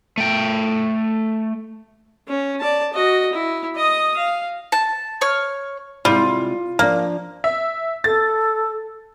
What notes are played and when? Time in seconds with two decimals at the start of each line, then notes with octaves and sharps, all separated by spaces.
0.18 A3 G5
2.28 C#4
2.60 D5 A5
2.93 F#4 D#5
3.33 E4
3.76 D#5 D#6
4.17 F5
4.72 A5
5.21 C#5 F6
6.05 C3 G3 G#3 E4 F4
6.79 F3 A#3 D4
7.44 E5
8.04 A4 A6